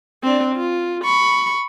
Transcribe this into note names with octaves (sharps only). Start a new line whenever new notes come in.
C4 D4
F4
B5 C#6